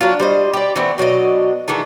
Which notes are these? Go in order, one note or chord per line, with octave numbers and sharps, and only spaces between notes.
F#3 D4 F4
G3 C5 D#5
G4 D5
E3 A3 B3 C4
B2 F#3 D4 D#5
D#3 E3 G#3 A3